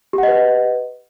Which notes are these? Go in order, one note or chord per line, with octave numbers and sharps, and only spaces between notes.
G4 B4 D#5 F#5